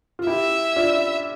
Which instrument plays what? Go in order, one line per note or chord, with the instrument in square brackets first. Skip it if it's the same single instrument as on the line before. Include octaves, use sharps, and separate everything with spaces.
[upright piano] F4
[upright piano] E4 G4 [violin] E5
[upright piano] D4 F4